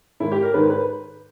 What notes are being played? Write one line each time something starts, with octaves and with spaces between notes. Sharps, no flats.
G#2 D#3 G#3 E4
G4
A#4
G#2 D#3 G#3 B4
B4